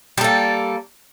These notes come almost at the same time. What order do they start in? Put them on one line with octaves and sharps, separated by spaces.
G3 A4 A#3